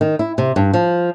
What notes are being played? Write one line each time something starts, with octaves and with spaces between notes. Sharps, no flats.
D#3
E4
C3
G2
F3